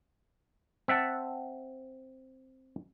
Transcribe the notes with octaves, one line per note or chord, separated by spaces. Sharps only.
C4 E5 F#5 A5